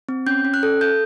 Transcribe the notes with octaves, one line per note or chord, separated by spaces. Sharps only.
C4
C#4 G6
C#4
F#6
A4
A4 G6